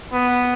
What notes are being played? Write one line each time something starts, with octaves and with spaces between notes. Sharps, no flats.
B3